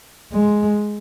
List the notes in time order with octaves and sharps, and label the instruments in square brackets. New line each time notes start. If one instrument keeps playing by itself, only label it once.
[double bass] G#3